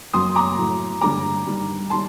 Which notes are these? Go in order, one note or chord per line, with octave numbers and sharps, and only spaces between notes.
F#2 F#3 C6 D#6
A#5 D6
A2 F#3
G2 D3 G3 A#5 D6
G2 D#3 G3
D#3 G3 A5 C6